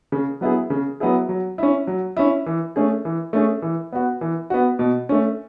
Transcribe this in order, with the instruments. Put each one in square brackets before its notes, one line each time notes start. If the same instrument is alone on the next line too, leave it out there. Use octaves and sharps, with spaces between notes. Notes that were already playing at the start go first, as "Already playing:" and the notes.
[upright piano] C#3
F#3 B3 E4 G#4
C#3
F#3 B3 E4 G#4
F#3
C#4 E4
F#3
C#4 E4
E3
A3 C#4 G#4
E3
A3 C#4 G#4
E3
B3 F#4
E3
B3 F#4
B2
A3 C#4